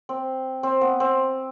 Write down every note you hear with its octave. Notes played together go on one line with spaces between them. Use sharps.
C4
C4
B3
C4